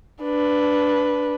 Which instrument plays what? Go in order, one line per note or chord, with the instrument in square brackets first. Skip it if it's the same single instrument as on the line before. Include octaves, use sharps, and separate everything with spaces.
[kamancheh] D4 B4